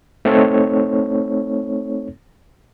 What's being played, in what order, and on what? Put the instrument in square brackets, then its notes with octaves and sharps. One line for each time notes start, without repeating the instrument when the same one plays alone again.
[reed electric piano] A3 C4 D#4 A4 C#5